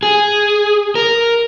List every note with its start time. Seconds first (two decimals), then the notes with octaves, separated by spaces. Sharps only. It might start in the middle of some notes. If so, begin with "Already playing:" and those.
0.03 G#4
0.95 A#4